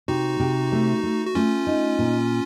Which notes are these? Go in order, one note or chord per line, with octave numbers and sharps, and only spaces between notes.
C3 D#4 F#4
C3
A3
A3
F#4
A3 C#4 F4
D#4
A#2